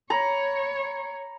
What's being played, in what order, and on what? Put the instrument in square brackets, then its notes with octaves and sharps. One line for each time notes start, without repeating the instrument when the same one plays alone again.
[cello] C#5 [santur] A#5 B5